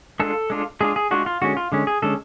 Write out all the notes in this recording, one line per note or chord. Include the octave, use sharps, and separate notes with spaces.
G#3 D4 F4 A4
G#3 D4 F4
G#3 D4 F4 G#4
G#4
G#3 D4 F4 F#4
F4
D3 G#3 C#4 F#4
F4
D3 G#3 C#4
G#4
D3 G#3 C#4 A4